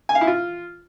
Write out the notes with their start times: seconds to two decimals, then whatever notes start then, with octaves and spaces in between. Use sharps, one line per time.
0.09 G#5
0.15 F5
0.21 E4
0.27 F4